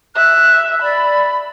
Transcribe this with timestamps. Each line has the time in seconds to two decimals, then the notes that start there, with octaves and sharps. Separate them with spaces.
0.16 E5 F#6
0.82 D5 B5